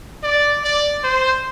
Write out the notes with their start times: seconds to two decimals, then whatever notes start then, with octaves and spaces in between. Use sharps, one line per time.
0.23 D5
0.64 D5
1.04 C5